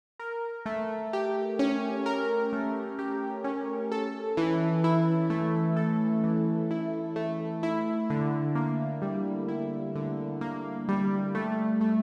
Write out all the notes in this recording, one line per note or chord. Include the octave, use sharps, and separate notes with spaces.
A#4
A3
G4
C#4
A#4
A3
G4
C#4
A4
E3
E4
A3
A4
E3
E4
A3
E4
D3
A#3
G3
E4
D3
A#3
G3
A3
A3